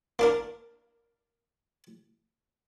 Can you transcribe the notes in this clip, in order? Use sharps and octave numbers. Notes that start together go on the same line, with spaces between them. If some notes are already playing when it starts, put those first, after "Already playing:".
A#3 D4 A#4